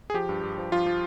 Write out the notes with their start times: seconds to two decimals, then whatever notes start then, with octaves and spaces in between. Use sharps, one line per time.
0.10 G#4
0.14 F3 G4
0.29 G2
0.43 G2
0.58 F3
0.72 F3 F4
0.86 F3